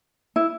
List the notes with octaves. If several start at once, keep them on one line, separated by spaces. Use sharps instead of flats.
E4